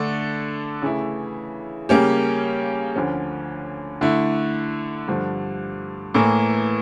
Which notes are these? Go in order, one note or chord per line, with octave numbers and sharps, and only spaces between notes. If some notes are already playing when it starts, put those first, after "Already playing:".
Already playing: D3 A3 D4 A4
C#3 E3 A3 E4
C#3 G3 A#3 C#4 G4
D2 D3 F3 C#4
D3 A3 E4
G2 D3 F3
A2 E3 A#3